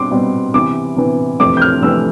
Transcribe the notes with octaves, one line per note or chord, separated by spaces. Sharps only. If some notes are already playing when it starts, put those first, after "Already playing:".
Already playing: B2 G3 C4 C6 D6
B2 G3 C4
C3 E3 B3 D6
C3 E3 B3
F2 C3 E3 A3 C4 D6
G6
F6
F2 C3 E3 A3 C4 E6